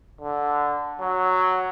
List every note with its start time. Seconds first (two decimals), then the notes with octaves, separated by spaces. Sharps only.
0.21 D3
1.01 F#3